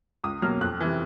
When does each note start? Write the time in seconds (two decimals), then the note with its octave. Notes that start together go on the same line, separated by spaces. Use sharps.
0.24 C#2 D#6
0.42 B2 F#3 A#3 F6
0.61 F2 F#6
0.80 C3 E3